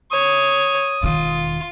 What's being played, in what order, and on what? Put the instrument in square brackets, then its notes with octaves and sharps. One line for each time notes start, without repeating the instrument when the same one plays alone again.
[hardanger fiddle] C#5 [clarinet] D#6
[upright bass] E1 D#3 [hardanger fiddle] F4